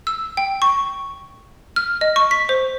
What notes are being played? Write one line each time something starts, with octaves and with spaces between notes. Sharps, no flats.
E6
G5
C#6
F6
D#5
C#6
B6
C5